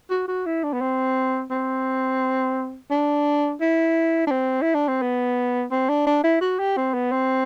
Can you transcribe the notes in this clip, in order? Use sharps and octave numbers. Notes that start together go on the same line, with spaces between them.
F#4
F#4
E4
D4
B3
C4
C4
D4
E4
D4
C4
E4
D4
C4
B3
C4
D4
D4
E4
F#4
G4
C4
B3
C4